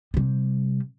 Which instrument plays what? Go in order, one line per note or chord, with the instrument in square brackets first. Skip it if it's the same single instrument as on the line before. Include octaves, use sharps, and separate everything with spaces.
[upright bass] C3 G3